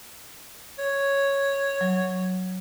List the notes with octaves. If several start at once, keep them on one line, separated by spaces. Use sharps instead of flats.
C#5
F#3